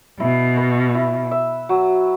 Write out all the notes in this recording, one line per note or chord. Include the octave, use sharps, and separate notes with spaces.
B2 E4
B4
E4
E5
F#3